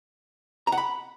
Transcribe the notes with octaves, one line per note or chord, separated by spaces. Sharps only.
A#5
F#5
B5